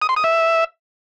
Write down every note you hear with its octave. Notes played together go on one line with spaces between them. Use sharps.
D#6
C6
D#6
E5